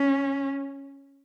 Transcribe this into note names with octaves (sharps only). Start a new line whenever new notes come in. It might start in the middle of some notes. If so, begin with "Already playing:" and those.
Already playing: C#4